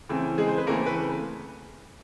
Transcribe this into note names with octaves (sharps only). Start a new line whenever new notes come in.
C#3 E3 A3 C4
G#3 G#4
C5
B4
C#3 E3 A3 A#3 C4 A#4
B4